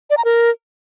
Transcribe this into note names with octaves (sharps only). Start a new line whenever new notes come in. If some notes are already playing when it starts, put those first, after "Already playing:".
D5
A#5
A#4